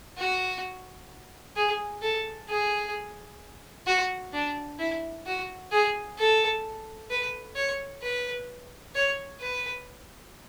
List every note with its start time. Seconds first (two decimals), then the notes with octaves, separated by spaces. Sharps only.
0.18 F#4
1.56 G#4
2.02 A4
2.49 G#4
3.86 F#4
4.33 D4
4.79 E4
5.26 F#4
5.72 G#4
6.18 A4
7.10 B4
7.56 C#5
8.02 B4
8.95 C#5
9.40 B4